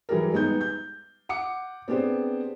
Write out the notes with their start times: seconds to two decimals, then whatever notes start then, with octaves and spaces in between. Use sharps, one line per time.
0.09 E3 F#3 G3 G4 G#4 A#4
0.32 G3 G#3 B3 D#4 G6
0.61 G6
1.29 F#5 D6 C#7
1.88 B3 C4 D4 G4 G#4 C5